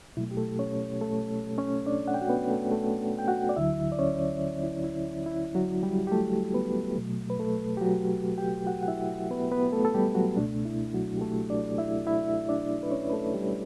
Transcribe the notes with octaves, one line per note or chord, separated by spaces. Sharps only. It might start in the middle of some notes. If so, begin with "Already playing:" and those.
B2 F#3 A3 E4
G4
A3 A4
C#4 C#5
A3 A4
C#4 C#5
D4 D5
F#5
G5
F#4 F#5
B3 B4
A3 A4
A3 A4
G5
F#4 F#5
D5
D2 D3 F#3 E4 E5
D5
C#4 C#5
E4
E4
E4
F#3 F#4
G3 G4
G4
A3 A4
B3 B4
B2 F#3 A3
B4
A3 A4
G4
F#3 F#4
G4 G5
F#4 F#5
F#5
E4 E5
B3 B4
B3 B4
A3 A4
A4
G3 G4
F#3 F#4
C#2 B2 A3 D4
E4
F#3 F#4
G4
A3 A4
D4 D5
E4 E5
E4 E5
D4 D5
B4
C#4 C#5
B4
A3 A4
G3 G4